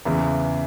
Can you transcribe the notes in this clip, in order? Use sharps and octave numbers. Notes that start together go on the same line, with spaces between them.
E2 C#3 E3